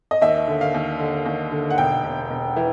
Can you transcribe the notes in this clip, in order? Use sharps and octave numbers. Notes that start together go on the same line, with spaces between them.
D#5
D#2 E5
D3
F5
D#2
D3
D#2
D3
F#5
E1 G5
E1
E1
E3